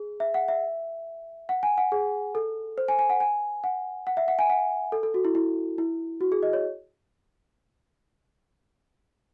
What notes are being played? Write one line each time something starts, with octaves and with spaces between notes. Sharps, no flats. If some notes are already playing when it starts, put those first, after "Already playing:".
Already playing: G#4
E5
F#5
E5
F#5
G#5
F#5
G#4
A4
C5
G#5
G#5
F#5
G#5
F#5
F#5
E5
F#5
G#5
F#5
A4
A4
F#4
E4
E4
E4
F#4
G#4
D#5
C#5